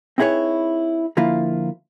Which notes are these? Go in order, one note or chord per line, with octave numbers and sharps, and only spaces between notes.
C4 D#4 E4 G#4 B4 C#5
D3 F3 A#3 E4 F4